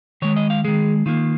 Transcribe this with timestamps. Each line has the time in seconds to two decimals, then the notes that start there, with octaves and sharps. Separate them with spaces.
0.22 D#3 G#3 C#5
0.37 D#5
0.50 F5
0.65 D#3 G#3 G#4
1.06 D#3 A#3 F4